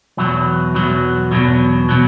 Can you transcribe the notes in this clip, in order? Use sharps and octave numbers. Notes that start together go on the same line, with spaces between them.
E2 B2 F#3
E2 B2 F#3
E2 B2 F#3
B2 F#3